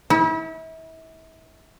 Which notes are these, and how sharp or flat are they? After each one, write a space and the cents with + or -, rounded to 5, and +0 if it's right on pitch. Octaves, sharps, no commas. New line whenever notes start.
E4 -35